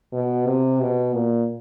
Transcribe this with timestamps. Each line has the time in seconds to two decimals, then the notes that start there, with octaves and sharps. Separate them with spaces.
0.13 B2
0.46 C3
0.80 B2
1.14 A#2